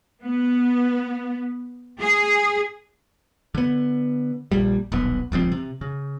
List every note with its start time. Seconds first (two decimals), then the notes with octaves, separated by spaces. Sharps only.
0.24 B3
2.01 G#4
3.55 D3 B3
4.52 A#1 A#2 G3
4.92 D#1 B1 B3
5.32 D#1 C#2 F3 C4
5.52 C3
5.81 C#3